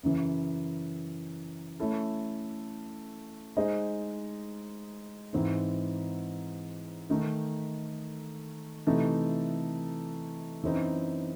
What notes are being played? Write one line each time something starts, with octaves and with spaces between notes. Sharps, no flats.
F#2 C#3 E3
A3 C#4 E4 A4
G#3 D#4 G#4 C5 D#5
G#2 E3 C4 D#4
D#3 A3 D#4
C3 E3 A3 D#4 A4
F#2 E3 C4 D#4